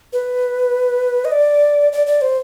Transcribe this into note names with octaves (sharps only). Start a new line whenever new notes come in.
B4
D#5
D5
D5
D5
C5